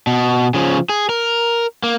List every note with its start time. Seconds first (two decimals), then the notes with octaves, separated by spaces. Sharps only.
0.07 B2
0.54 C#3 F3
0.89 G#4
1.09 A#4
1.83 A#3